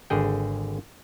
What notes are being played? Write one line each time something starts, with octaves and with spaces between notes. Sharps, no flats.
G#1 D3 G#4 G5